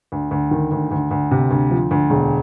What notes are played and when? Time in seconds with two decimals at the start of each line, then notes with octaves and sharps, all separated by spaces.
0.12 D2
0.31 D2
0.51 D#3
0.72 D2
0.91 D2
1.11 D2
1.31 C3
1.51 D2
1.71 F3
1.91 D2
2.10 E1